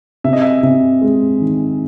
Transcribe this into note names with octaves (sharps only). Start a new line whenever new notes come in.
C3 E5
D#5
E5
C3 E5
G#3
D#3